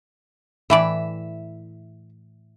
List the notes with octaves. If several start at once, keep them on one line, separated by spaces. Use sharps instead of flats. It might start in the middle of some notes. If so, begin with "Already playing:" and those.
A2 E3 D5 E5